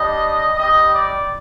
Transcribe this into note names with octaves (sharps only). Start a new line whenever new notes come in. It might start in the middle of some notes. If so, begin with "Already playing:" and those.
Already playing: G3 D4 G4 D#5
G3 C4 G4 D#5
D5